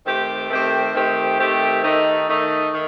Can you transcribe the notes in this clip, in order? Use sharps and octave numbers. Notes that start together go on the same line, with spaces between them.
D#3 A3 C4 G4
D#3 A3 C4 G4
D#3 A3 C4 G4
D#3 A3 C4 G4
D#3 A3 D#4
D#3 A3 D#4
D#3